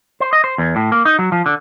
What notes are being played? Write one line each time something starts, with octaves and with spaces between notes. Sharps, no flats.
C5
D#5
C5
E2
A2
A#3
D#4
F#3
F3
D3